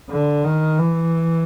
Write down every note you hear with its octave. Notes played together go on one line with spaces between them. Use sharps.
D3
D#3
E3